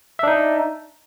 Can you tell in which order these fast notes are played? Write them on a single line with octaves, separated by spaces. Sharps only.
E5 D4 D#4